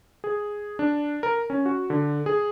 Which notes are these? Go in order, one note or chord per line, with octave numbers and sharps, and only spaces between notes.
G#4
D4
A#4
C#4
F#4
D3
G#4